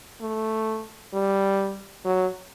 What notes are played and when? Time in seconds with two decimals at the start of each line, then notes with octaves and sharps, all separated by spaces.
0.21 A3
1.13 G3
2.05 F#3